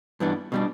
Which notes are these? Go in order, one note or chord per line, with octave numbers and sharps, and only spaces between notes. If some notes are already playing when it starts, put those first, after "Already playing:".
G2 E3 B3 D4
B2 G3 D4